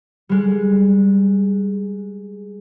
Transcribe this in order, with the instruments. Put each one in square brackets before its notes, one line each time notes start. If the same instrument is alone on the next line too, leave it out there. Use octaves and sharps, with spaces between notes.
[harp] G3 G#3